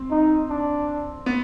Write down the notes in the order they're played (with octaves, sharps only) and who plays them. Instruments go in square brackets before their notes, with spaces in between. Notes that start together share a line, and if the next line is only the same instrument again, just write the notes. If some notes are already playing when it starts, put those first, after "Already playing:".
Already playing: [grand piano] C4
[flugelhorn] D#4
D4
[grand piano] B3